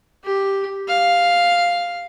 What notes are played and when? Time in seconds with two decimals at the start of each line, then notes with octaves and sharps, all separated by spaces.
0.24 G4
0.88 F5